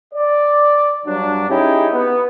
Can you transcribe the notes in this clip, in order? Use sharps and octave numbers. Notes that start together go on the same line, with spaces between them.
D5
G2 F#3 D4
C#4 D#4 E4 G4 G#4
B3